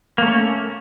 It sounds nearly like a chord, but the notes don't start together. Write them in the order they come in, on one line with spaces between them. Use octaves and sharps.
A#3 A3 C#4